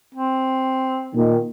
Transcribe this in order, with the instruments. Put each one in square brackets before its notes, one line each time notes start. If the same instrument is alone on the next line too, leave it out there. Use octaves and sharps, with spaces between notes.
[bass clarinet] C4
[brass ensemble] A#2 D#3